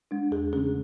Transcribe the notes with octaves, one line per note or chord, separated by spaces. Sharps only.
G#3 D4
E2 G#4
C#3 E3 A3 C#4 G#4